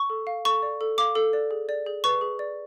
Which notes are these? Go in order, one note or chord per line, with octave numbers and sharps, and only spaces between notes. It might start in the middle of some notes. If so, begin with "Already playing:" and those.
Already playing: C#6
A4
F5
A4 C#6
D5
A4
F5 D6
A4
D5
G#4
D5
G#4
B4 C#6
G#4
D5